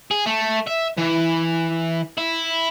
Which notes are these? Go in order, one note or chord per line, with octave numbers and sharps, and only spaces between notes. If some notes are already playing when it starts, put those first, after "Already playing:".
G#4
A3
E5
E3
E4